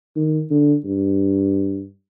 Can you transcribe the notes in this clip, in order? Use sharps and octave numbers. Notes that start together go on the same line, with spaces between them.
D#3
D3
G2